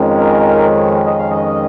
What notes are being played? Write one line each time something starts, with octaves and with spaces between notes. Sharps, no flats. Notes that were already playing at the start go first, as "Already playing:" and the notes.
Already playing: F2 D#3 G#3 C#4
A#4
D#5
F5
D#5